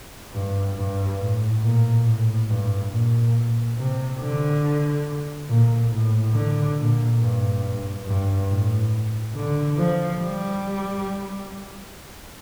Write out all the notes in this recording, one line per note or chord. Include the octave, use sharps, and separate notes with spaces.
G2
G2
A2
A#2
A2
G2
A#2
C3
D3
A#2
A2
D3
A#2
G2
G2
G2
A2
D3
F3
G3